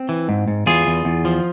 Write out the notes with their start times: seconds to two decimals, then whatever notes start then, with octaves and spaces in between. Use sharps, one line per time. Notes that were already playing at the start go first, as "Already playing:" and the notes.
Already playing: C4
0.09 E3
0.29 G#2
0.48 G#2
0.66 E2 F4 G#4
0.87 E2
1.05 E2
1.25 F3